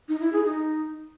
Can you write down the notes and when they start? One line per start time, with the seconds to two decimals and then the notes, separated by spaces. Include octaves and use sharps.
0.09 D#4
0.21 E4
0.33 G#4
0.45 D#4